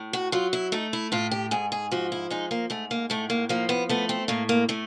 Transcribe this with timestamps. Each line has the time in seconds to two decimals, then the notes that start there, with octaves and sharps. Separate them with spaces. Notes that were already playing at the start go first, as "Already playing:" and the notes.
Already playing: A2
0.13 F#4
0.32 F#3 F4
0.53 E4
0.72 A3 D#4
0.93 E4
1.12 A2 F4
1.31 G4
1.51 G#2 G#4
1.72 G#4
1.91 F3 F#4
2.12 E4
2.30 G#3 D#4
2.51 A#3
2.70 G#2 A3
2.91 A#3
3.10 A2 A3
3.30 A#3
3.49 F3 A#3
3.69 B3
3.89 A3 B3
4.09 C4
4.28 A2 A#3
4.49 A#3
4.69 A2 A3